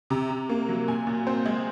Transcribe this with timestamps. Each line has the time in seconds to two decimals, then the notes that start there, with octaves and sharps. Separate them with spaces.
0.10 C3 A#5
0.30 C3
0.50 A#3
0.69 F#3
0.88 A#2 G#5
1.07 A#2
1.27 C4 C5
1.46 G#3